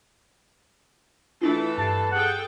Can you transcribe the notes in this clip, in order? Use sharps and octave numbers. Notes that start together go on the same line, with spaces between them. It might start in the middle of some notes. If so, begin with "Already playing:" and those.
E3 A3 D4 E4 F4 A4
G2 G4 A5 C7
G#4 A4 F#5 G5